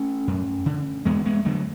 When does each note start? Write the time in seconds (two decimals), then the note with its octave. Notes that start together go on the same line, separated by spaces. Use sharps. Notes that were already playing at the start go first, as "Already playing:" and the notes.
Already playing: A3 C#4
0.27 F#2
0.66 D3
1.05 E2 G#3 B3
1.26 G#3 B3
1.45 D3 F#3 A3